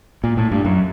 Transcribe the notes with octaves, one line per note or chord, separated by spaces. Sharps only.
A#2
A2
G2
F#2